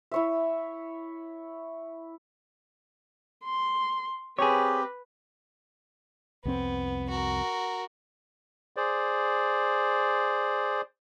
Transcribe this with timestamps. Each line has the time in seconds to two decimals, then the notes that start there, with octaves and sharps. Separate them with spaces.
0.12 E4 C#5 E5
3.44 C6
4.39 C4 G4 G#4 B4 C#5
6.45 C2 F2 B3 C4
7.10 F#4 A#4
8.76 G#4 C5 D5